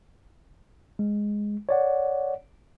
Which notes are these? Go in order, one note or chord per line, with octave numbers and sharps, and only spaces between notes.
G#3
C#5 D5 F#5